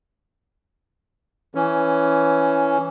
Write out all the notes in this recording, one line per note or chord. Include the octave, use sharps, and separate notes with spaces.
E3 C#4